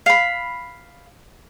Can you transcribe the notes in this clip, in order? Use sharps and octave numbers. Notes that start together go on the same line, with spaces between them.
F5 B5